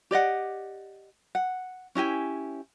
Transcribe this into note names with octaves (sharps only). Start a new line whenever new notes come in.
G4 D5 D#5 F#5
F#5
C#4 E4 G4 G#5